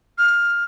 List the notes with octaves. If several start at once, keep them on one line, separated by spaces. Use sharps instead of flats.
F6